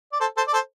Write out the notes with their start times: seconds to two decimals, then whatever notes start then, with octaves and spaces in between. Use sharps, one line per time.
0.12 D5
0.20 A4 C5
0.37 A4 C5
0.48 D5
0.53 A4 C5